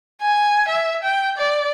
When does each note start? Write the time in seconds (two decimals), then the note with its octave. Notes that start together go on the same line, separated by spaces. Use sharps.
0.21 G#5
0.68 E5
1.03 G5
1.37 D5